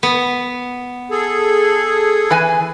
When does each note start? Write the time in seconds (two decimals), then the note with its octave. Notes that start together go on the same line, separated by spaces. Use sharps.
0.03 B3
1.11 G#4 A4
2.30 E3 B4 G#5